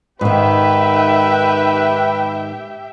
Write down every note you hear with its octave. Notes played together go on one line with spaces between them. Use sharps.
G#2 D#3 G4 B4 E5 G5